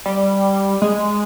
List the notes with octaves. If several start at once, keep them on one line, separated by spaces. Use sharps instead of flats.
G3
G#3